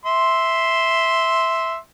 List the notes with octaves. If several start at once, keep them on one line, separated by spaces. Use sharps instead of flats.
E5 C6